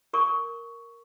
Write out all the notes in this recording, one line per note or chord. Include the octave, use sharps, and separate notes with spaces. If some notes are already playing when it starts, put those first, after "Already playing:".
A#4 C#6 D6